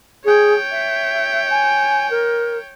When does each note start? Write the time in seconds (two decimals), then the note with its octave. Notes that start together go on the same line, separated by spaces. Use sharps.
0.25 G#4 C#5 G5
0.71 E5
1.50 G#5
2.10 A#4